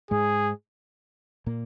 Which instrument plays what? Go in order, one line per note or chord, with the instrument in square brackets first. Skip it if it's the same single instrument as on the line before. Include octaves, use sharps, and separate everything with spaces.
[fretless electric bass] G#2 G#3 [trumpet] G#4
[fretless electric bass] A#2 A#3